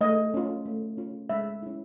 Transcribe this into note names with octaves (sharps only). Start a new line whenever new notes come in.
A3 D#5
C#4 F4
A3
C#4 F4
G#3 E5
C#4 E4